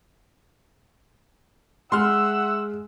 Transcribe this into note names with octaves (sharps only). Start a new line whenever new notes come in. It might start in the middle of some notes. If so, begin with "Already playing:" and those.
G#3 E5 F#5 C6 E6 F6